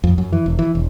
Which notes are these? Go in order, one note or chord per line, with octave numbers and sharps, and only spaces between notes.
F2
F#2
E3
E1
E3
E1